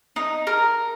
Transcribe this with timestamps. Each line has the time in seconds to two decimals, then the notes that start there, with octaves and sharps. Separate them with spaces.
0.16 D#4
0.47 A#4